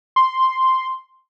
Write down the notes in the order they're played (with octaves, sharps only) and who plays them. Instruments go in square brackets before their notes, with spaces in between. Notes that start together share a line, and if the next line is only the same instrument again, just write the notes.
[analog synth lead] C6